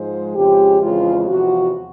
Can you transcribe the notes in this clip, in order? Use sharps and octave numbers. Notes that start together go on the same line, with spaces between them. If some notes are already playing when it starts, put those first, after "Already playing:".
Already playing: G#2 F3 G#3 C5
F2 C#3 F3 G#3 G4
F2 C#3 E3 G#3 F4
E2 C3 F3 F#4